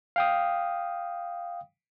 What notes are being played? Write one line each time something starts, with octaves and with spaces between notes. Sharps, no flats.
F5 G5 D#6